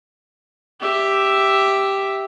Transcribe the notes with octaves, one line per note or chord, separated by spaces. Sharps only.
G4 E5